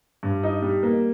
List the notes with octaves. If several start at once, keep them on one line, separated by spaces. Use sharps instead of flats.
G2
D#4
G3
A#3